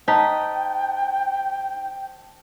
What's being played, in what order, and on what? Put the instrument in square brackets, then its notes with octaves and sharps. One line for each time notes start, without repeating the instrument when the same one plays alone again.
[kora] D#4 [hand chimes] C5 A5 B6 [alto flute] G5